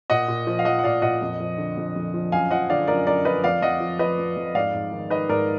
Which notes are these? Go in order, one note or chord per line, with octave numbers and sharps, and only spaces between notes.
A#2 D#5 F#5
A#2
F3
F5
F3 D#5 F#5
F#5
A#2 D5 F5
A#2 D#5 F#5
F2
F3
D3
F2
F2
F3
F#2 F5 G#5
F3 D#5 F#5
D3 D5 F5
F#2 A#4 D5
F#2 A#4 D5
F3 B4 D#5
F2 D5 F5
F2 D#5 F#5
F3
F3 B4 D#5
F2
F2
G#2 D5 F5
G#2
D#3
D#3 B4 D#5
G#2 A#4 D5